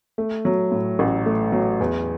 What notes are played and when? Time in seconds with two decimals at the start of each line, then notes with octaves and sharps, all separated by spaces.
0.18 A3
0.45 F#3
0.72 A2
0.99 A1
1.26 A3
1.52 F#3
1.80 E2